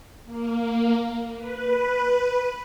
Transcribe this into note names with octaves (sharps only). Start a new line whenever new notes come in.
A#3
B4